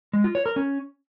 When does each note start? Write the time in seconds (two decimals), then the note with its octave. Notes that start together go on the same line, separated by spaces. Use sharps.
0.13 G#3
0.24 F4
0.35 C#5
0.46 A#4
0.56 C#4